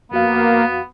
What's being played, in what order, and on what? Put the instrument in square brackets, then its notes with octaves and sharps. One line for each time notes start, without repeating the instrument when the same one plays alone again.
[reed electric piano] F2 F#4 F5 [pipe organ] A#3 [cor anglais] B3